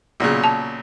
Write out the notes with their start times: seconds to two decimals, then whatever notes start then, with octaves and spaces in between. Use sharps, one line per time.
0.20 B1 A#2 C#3
0.44 A5